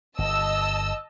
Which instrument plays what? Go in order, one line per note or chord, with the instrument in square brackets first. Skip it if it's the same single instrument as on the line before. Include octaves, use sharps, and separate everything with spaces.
[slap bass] G1 [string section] D#5 A5 E6